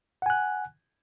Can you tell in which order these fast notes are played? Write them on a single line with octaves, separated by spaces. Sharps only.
F#5 G#5 F#6